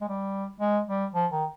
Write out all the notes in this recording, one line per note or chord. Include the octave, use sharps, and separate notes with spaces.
G#3
G3
G#3
G3
F3
D#3